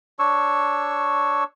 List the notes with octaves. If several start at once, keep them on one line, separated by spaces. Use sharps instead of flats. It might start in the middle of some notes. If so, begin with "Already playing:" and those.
D4 C#5 C#6 E6